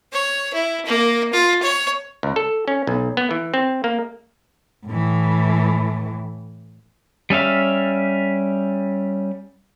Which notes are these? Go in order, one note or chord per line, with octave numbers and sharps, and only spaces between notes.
C#5
E4
A#3
F4
C#5
C#2
A4
C#4
B1
B3
E3
C4
A#3
A2 E3
G3 C#4 E5 F5